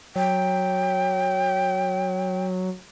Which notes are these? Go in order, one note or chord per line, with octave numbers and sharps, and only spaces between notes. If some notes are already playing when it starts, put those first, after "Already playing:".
F#3 G5